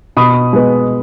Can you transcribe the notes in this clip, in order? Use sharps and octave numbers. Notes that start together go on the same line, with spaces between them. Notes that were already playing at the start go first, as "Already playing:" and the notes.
B2 B5 D#6
G#3 B3